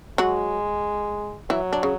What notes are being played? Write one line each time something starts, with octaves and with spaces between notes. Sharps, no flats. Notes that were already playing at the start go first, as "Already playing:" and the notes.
F#3 G#3 F#4
E3 F#3 E4
D4
C#3